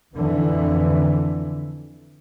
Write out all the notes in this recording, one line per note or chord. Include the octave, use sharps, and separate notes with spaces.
F2 D3 E3